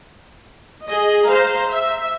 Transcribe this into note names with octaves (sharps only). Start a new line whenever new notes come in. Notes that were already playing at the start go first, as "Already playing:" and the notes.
G#4 D#5
C5 F5 A#5
E5